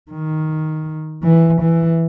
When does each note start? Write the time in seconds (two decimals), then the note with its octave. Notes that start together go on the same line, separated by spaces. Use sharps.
0.11 D#3
1.23 E3
1.62 E3